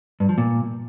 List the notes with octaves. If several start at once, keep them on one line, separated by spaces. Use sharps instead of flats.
G2
F3
A#2